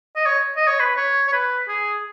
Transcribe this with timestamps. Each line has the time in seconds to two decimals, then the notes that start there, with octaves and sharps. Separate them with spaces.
0.16 D#5
0.26 C#5
0.57 D#5
0.67 C#5
0.80 B4
0.96 C#5
1.28 C#5
1.33 B4
1.68 G#4